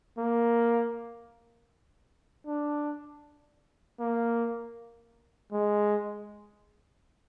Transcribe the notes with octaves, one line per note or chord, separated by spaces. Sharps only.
A#3
D4
A#3
G#3